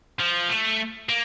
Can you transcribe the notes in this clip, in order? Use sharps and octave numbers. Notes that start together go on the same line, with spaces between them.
F3
A3
A#3